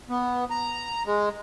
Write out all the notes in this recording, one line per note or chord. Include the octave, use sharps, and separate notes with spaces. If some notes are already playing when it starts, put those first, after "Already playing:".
B3
A#5
G#3